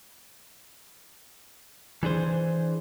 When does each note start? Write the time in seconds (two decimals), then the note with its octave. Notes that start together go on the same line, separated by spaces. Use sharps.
2.03 E3 D4 G#4 C5